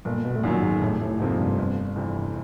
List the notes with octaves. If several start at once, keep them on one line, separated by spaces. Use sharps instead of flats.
G1 A#2
B2
A2
F#2 A#2 D#3 F#3
G#2
F1 A2
A2
F2 G#2 C3 F3 A#3
G2
G1
F2 C3 E3